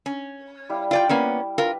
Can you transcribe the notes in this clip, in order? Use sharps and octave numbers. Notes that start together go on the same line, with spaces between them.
C#4
G3 E4 F5
F4 D5 G5
A#3 B3 C#4
F4 A#4 B4